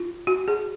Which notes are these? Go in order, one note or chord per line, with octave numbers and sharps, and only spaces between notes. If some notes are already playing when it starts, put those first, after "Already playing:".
Already playing: F4
F#4
G#4